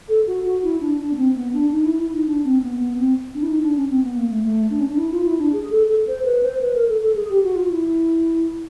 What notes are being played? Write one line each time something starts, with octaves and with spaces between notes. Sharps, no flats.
A4
F#4
F#4
E4
D4
D4
B3
C4
B3
D4
D#4
E4
E4
D#4
D4
C4
B3
B3
C4
D4
E4
D#4
D4
C#4
C4
B3
A#3
A3
A3
D4
C#4
D4
E4
F4
E4
D4
G#4
A4
A4
C5
B4
C5
B4
A#4
A4
A4
G#4
G4
F#4
F4
E4